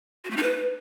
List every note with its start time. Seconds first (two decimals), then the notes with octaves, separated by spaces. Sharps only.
0.25 F#4
0.31 A3
0.37 D#4
0.43 B4